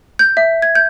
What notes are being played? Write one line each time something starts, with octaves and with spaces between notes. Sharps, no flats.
G6
E5
G#6
G6